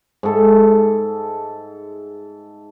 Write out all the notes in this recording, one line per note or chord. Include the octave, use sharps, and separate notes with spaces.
G#2 A4 E5